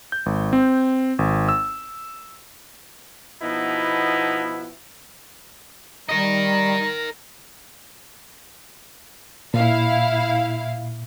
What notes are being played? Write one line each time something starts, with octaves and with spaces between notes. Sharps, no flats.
G6
G#1
C4
G#1
E6
B2 F3 B3 D#4 E4
G3 A#4 D#5 A#5
A#2 E4 F5